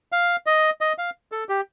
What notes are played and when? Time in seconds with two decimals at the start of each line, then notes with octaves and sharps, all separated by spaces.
0.12 F5
0.46 D#5
0.81 D#5
0.98 F5
1.32 A4
1.49 G4